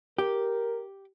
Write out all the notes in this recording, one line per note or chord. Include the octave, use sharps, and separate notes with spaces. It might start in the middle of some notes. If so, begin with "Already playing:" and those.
G4 A#4